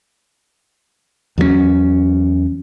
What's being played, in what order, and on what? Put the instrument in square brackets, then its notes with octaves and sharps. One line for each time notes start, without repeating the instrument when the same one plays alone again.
[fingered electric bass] E2 F#3 G#3 C#4